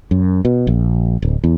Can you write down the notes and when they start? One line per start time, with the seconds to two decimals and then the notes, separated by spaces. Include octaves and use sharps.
0.11 F#2
0.45 B2
0.67 A#1
1.22 D1
1.44 E2